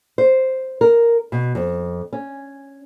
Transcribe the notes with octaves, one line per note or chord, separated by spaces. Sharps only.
C5
A#4
B2
F2
C#4